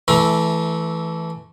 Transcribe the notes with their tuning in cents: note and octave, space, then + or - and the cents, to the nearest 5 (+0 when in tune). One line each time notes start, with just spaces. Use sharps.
E3 +0 A3 -15 A#5 +35